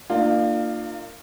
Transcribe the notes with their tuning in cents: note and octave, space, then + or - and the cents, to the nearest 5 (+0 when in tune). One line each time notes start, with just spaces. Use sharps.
A#3 -25 D4 +40 F4 +0